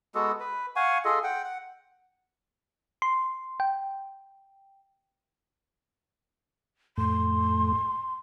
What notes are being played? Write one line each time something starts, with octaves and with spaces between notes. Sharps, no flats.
G#3 B3 F#4 A4
B4
F5 F#5 G#5 C#6
F4 G#4 A4 D#5
F#5 G5
F#5
C6
G5
F2 A2 A3 C6